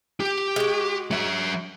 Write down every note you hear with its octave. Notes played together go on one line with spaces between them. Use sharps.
G4
G#3 F#4
F#3 E5